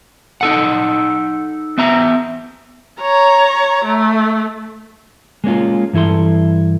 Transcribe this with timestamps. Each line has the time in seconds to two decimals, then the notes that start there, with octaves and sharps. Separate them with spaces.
0.41 D#4 A4 F#5
1.78 B3 E5 A#5
3.01 C#5 A#5
3.85 A3
5.44 G#3 A#3 C#4 F4
5.93 G2 E3 E4 A4 C6